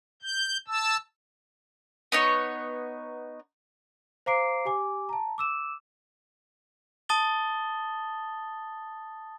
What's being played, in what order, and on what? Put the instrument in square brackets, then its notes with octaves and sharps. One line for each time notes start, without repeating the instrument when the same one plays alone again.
[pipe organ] G6
A5 E6
[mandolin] B3 D#4 C#5
[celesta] C5 F5 A#5 D6 C7 D7
G4 G#5 D6
A5 A#5
D6 E6 E7
[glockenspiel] A5 D#6 A6 G7